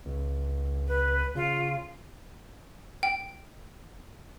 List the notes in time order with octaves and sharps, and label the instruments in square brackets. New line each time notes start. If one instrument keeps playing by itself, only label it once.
[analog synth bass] C#2
[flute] B4
[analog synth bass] C#3 [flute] F4
[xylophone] G5